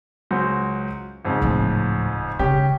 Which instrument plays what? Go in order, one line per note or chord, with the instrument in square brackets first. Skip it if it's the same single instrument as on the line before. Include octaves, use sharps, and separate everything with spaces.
[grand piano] C#2 F#3 C5
G#1 F2 C#3
[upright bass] D1 F3
[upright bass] C#3 G#3 [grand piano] C#4 G4